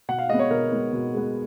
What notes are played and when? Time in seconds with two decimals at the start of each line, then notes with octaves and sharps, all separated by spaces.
0.08 B2 F#5
0.18 F5
0.29 G#3 D#5
0.34 B3
0.39 C#5
0.50 B2 A#4
0.72 G#3 B3
0.93 B2
1.13 G#3 B3